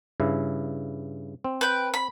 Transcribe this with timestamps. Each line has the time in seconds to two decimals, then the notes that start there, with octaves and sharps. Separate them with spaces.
0.20 G2 C#3 E4
1.44 C4
1.61 B4 G5
1.94 B5